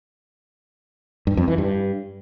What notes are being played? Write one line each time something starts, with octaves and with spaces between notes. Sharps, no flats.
G2
F2
E3
G2